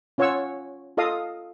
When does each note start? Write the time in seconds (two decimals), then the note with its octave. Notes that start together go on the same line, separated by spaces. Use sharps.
0.18 C#4 F4 C#5 F#5 C#6 E6
0.97 F4 A4 D#5 F5 D#6